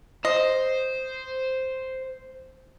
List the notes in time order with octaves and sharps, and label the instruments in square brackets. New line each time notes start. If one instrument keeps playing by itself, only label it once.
[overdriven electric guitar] C5 [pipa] D#5